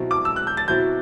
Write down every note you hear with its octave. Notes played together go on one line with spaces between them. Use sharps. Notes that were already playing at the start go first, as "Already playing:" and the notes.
Already playing: B2 F#3 C4 E4
D6
E6
F#6
G6
A6
B2 F#3 C4 E4 G6